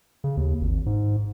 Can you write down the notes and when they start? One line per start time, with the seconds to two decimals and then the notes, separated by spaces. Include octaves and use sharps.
0.24 C#3
0.37 D#2
0.61 G#1
0.86 G#2